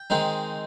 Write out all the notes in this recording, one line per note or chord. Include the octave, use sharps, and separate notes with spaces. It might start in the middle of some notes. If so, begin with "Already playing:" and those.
Already playing: G5
D#3 G#3 C4 D#4